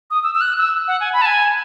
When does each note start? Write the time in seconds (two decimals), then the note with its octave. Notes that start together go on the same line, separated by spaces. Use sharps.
0.11 D#6
0.23 E6
0.35 E6
0.41 F#6
0.58 E6
0.88 F#5
1.00 G#5
1.13 B5
1.22 A5
1.26 G#5